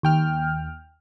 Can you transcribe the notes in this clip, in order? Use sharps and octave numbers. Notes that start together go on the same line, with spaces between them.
D#2 G5 F6